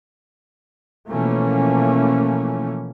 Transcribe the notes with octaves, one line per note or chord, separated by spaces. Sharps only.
B2 E3 F3 A3 A#3 C#4